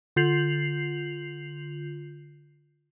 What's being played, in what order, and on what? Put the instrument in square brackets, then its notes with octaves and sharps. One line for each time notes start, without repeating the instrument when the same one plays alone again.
[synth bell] D3 F4 G6 C7 F7 F#7